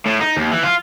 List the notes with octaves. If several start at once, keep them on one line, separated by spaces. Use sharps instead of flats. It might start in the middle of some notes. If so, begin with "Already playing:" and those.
A2
D#4
D#2
E3
F4